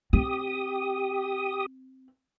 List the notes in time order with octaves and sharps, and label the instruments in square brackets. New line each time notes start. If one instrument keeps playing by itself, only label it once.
[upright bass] C4 [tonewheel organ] G4 D#6